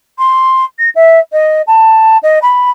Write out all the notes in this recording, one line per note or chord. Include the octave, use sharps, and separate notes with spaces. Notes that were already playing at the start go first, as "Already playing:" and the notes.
C6
A#6
E5
D#5
A5
D#5
B5